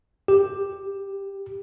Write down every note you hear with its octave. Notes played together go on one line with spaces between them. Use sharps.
G4